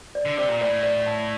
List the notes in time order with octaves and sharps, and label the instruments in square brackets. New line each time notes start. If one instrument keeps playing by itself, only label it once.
[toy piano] D5
[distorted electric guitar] D3
[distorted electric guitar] C3 [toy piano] D5
[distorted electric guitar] A#2
[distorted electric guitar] A2 [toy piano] D5
[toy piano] D5
A5